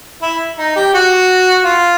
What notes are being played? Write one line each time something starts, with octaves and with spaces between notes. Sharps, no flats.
E4
D#4
G4
F#4
F4